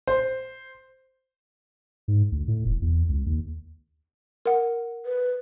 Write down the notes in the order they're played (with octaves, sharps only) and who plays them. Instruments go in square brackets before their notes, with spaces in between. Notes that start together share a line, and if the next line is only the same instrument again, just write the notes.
[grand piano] C5
[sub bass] G#2
D2
A2
E1
E2
C#2
D#2
[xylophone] A#4 F#5
[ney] B4